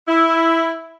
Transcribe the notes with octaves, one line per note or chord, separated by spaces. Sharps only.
E4